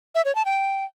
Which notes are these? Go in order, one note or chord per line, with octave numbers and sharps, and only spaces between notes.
E5
C#5
A5
G5